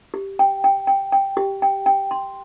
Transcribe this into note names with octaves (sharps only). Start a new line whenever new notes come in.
G4
G5
G5
G5
G5
G4
G5
G5
C6